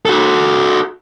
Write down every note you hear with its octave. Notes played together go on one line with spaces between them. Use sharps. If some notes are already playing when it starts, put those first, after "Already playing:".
F#4 A4